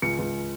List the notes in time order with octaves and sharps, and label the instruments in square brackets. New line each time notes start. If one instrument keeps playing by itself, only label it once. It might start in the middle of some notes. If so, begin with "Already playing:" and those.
[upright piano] C#2 C#7
C#2